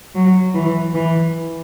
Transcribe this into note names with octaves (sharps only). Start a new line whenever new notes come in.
F#3
E3
E3